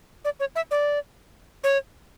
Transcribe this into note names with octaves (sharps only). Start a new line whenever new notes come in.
D5
C#5
E5
D5
C#5